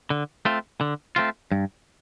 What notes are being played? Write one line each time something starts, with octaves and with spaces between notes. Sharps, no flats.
D3
A3 C4 F4
D3
A3 C4 F4
G2